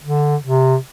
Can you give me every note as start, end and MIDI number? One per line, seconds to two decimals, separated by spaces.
0.03 0.36 50
0.41 0.77 48